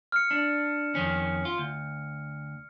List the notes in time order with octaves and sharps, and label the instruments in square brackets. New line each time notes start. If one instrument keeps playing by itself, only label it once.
[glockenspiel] F6 C#7
[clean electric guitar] D4
F2 D#3 C#4
F4
D2